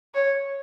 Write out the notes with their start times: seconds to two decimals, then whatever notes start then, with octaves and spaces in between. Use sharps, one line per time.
0.15 C#5